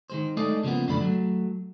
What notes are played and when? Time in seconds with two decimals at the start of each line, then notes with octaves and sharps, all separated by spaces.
0.10 D#3 G#3 C5
0.37 G#3 A3 D#4 A4 D5 D#5
0.64 C#3 F3 G#3 A#3 B3
0.87 B1 F2 D3 A3 D5 B5
1.01 F#3 A3